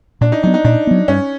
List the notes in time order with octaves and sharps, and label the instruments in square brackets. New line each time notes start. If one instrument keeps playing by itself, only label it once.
[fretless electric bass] A#2 [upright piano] D4
[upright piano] D#4
[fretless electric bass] F#3 B3 [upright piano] D#4
[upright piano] D#4
[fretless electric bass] A#2 [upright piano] D4
[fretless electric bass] F#3 B3
[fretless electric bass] G2 [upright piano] C#4